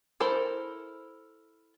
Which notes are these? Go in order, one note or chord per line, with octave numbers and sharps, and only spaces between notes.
E4 A4 A#4 C5